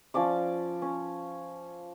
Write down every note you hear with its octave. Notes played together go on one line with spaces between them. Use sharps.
F3 C#4 D5 D6
C#4